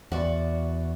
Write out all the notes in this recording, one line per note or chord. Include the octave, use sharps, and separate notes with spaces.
E2 F#4 D5